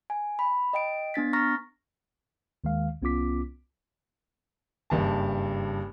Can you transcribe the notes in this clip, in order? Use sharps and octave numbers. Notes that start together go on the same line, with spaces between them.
G#5
B5
D#5 G5 D7
B3 D4 A6 B6
A#5 C#6 F6 A6 A#6
D#2 D#3 G#3 F5
C2 B3 C#4 F4 D6 B6
F#1 G2 A5